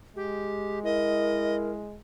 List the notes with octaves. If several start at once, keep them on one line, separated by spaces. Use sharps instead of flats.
G#3 G4
E4 A#4 D#5